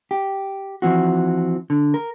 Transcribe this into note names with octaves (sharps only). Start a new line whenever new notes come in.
G4
E3 F3 C4 F#4
D3
A#4